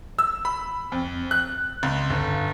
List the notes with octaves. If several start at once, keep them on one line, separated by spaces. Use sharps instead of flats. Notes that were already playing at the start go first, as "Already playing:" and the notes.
E6
B5
F2
F#6
C#2
G1